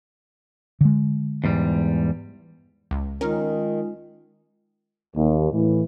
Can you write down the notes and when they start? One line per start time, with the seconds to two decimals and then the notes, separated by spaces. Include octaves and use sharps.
0.81 D3 G#3
1.44 E2 G#2 G3
2.91 C#2
3.21 D#3 G#3 C#4 D#4 F4 A#4
5.15 D#2
5.51 A2 E3